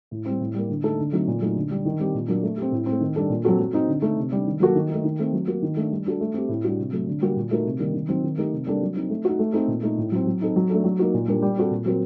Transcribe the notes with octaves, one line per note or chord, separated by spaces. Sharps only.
A2
G3 C4
A2
G3 A#3
D3
A3 D#4 A4
D3
F#3 A3 C4 D#4
A#2
F#3 A3 D#4
D3
G3 D4
D#3
G3 C4 G4
A#2
F#3 A#3 D4
A3
C4 G4
A2
C4
A3
D#3
G3 D4 A4
A#2
F#3 C4 F#4 A4
F#3
C4 D#4
D3
A3 D#4
C3
G3 D4
D#3
F#3 A#3 F#4 A4
D#3
A3 D#4
D#3
A3 C4
F#3
A#3 F#4
D#3
A3 D4
G3
D4 F#4 A4
A3
C4 G4
A2
G3 D4 F#4
C3
F#3 A3
D3
G3 A#3 F#4
A#2
A3 D#4 F#4 A#4
C3
D#3 G3 A#3
D#3
F#3 C4 D#4
D#3
A3 D#4 G4 A#4
C3
G3 A#3 D4 A4
F#3
C4 D#4
A3
D#4 F#4
A3
C4 D#4 A4
A#2
A3 D#4
A2
F#3 C4
F#3
C4 D#4 A4
F#3
A3 D4 A4
F#3
A#3 D#4 F#4
A#2
G3 D4 G4 A#4
G3
C4 F#4 A4
A#2
F#3 C4 F#4 A#4